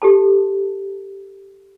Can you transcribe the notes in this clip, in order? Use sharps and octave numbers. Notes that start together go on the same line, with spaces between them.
G4 A4 A5